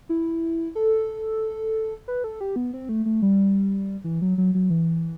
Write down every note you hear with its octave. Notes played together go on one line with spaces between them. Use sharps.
E4
A4
B4
A4
G4
B3
C4
A3
A3
G3
E3
F#3
F#3
F#3
E3